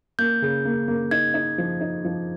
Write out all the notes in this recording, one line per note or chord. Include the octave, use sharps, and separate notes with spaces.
A#3 G6
C#3
A#3
A#3
D#4 G#6
D#4
F3
D#4
F3